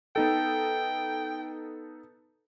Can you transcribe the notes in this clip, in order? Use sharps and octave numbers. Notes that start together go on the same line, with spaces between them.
B3 D#4 A4 G5